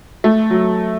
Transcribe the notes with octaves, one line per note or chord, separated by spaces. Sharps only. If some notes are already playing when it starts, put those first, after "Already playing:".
A3
F#3